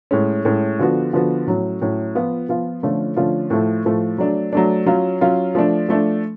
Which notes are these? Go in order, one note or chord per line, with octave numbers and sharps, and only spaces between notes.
A2 G#3 C#4
A2 G#3 C#4
D3 F3 B3 F#4
D3 F3 B3 F#4
A2 F#3 C#4
A2 F#3 C#4
F3 B3 F4
F3 B3 F4
D3 F3 A3 C#4 F4
D3 F3 A3 C#4 F4
A2 F3 A3
A2 F3 A3
F#3 A3 D4
F#3 A3 D4
F#3 C#4 F4
F#3 C#4 F4
F3 A3 D4
F3 A3 D4